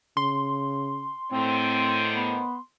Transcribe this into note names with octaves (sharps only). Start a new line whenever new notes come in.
C#3 C6
A2 D3 D#3 C4 C5
B3